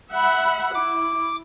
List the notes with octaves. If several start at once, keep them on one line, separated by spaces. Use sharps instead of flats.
E5 F#5 B5
E4 D6